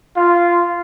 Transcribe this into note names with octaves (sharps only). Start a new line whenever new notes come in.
F4